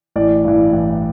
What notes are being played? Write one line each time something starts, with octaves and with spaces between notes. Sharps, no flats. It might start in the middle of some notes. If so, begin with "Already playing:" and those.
A1 D5
G2 E3
A1